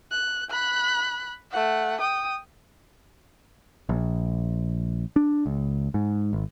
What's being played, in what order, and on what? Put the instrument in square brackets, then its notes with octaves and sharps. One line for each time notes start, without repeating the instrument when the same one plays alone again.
[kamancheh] F#6
B5 F#6
A3 F#5
G5 D#6
[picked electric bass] A#1
D4
C#2
G#2
G#1